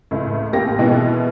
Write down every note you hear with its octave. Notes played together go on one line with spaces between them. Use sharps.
C#2 A2
A1 A#3 G4 A#6
B2 E3 G#3 B3 E4 G4